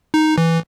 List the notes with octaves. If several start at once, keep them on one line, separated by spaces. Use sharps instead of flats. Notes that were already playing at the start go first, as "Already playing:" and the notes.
D#4
E3